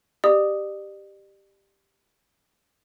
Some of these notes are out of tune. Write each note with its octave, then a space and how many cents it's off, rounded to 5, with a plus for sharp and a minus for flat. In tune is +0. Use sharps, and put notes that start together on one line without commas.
G4 +0 D5 +40 D#6 +0